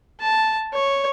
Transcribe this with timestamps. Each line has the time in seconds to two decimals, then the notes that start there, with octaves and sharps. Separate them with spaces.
0.20 A5
0.73 C#5